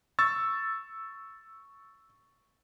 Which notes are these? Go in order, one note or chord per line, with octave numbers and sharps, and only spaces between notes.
C#6 E6 A6